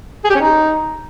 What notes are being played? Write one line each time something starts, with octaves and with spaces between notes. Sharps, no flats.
G#4
G4
C#4
D#4